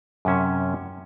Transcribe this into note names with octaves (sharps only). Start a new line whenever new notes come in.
F#2 C3 C#4 E5